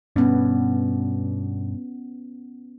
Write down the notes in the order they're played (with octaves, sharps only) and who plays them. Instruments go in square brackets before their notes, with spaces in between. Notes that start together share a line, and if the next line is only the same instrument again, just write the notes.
[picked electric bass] G2 B2 [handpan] B3 C#4